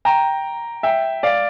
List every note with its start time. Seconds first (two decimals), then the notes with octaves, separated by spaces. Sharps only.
0.05 G5 A#5
0.83 E5 G5
1.23 D5 F5